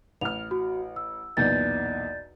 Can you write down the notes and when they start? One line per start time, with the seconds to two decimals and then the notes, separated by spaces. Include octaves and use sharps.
0.21 A1 F6 F7
0.51 F#4
0.96 E6
1.37 B1 E2 A#2 D5 G6 A6